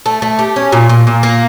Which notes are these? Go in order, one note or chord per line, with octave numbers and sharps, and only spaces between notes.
A3
A3
G4
C#4
A#2
A#2
A#2
A#3